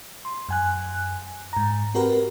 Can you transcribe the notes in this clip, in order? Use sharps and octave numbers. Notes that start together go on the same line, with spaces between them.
C6
F#2 G#5 F#6
G#2 A#5
C4 F#4 G4 A#4 B4